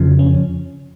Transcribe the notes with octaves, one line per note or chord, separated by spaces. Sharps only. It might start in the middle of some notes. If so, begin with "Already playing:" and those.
Already playing: F2 C#3 F3
C#4